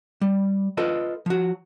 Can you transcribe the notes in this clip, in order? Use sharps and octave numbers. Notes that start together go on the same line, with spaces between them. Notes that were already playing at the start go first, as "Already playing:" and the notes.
G3
F4 A4 B4 D#5
F3 F#4